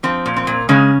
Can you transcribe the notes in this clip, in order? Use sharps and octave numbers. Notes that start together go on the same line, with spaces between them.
F3 C4
A#2
C4
A#2
C#3 G#3 C#4